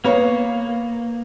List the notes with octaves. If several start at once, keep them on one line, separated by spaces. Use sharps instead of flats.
A#3 B3 C#5 F5